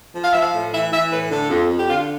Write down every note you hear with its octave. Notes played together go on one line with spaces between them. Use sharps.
F3
F5
F3 E5
F5
A2
E3 E5
E3 E5
A2 B4
D3 A4
F2
F2
G4
D3 F4